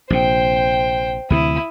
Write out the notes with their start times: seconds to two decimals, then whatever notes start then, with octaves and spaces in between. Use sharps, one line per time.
0.10 A#1 C3 C5 G5
1.30 D2 C3 E3 E4 D#6